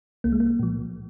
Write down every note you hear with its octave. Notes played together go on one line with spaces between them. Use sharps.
C2 A#3
G#3
A#3
A#2 F3